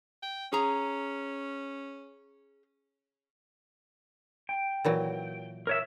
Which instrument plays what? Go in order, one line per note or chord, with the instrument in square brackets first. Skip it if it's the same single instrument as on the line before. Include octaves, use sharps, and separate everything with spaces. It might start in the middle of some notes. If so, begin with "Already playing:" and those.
[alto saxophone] G5
[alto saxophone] C#4 [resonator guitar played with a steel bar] G#4 A#5
[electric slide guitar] G5
[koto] A#2 E3 F#3
[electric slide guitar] A#4 C#5 E5